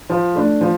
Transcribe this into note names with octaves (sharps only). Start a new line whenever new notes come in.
F3
A3 D4
F3